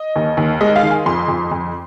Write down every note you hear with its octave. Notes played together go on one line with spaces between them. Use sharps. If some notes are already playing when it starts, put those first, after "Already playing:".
Already playing: D#5
D#2
D#2
G#3 D#5
F5
D#3
G#5
F2 C6
F2
F2